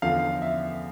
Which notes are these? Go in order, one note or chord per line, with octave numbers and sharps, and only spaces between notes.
E2 D3 F3 F5
E5